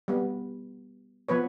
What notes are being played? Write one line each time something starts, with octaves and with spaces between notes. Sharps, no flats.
G3 B3
F3 B3 B4 C#5